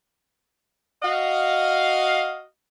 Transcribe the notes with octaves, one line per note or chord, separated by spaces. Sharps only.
F#4 D#5 F5